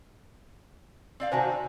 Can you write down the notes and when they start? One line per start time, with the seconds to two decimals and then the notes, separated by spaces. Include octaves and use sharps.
1.20 C4 D5 F5
1.32 C3 D#3 F#4 C5 G#5 A5